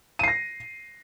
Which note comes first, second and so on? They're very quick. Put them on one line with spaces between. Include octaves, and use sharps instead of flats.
D#7 C7 A#6